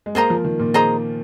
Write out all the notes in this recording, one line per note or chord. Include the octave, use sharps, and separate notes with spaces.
G#3
A#3 G#4 C5 D#5 A#5
F3
D#3
A#2
G#4 C5 D#5 A#5